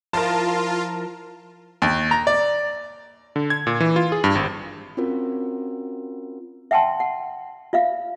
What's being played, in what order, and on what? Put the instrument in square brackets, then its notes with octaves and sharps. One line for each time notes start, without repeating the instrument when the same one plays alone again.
[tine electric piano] F3 E4 [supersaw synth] F4 [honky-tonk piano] A#4 A5
[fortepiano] D#2
A#5
D5
[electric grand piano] D3
G#6
A#2
E3
F4
G#4
G2
G#1
[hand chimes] C4 C#4 F4 F#4 A#4
[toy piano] E5 F#5 G5 A5 C6
F#5
F4 E5 F5